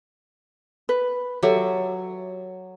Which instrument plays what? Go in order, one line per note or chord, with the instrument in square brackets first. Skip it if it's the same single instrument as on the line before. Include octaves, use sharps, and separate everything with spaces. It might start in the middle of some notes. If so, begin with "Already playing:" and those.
[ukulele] B4
[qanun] F#3 [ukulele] G4 A4 E5